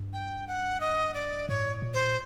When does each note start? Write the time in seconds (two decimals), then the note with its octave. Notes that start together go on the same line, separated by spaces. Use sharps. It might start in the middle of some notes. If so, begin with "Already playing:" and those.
Already playing: G2
0.13 G5
0.47 F#5
0.81 D#5
1.14 D5
1.49 A2 C#5
1.82 A#2
1.94 C5